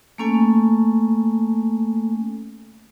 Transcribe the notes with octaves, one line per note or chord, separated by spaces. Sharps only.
A3 A#3 C#4 A4 G#5